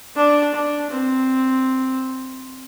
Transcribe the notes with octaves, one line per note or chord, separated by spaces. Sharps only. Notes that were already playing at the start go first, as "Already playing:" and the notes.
D4
D4
C4